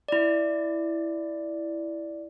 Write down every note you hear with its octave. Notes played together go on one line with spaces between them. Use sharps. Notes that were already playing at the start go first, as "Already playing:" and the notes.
E4 D5